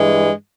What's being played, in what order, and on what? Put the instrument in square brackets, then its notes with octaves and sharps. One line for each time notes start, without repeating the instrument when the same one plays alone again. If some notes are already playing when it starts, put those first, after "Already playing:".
Already playing: [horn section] G2 E3 G#3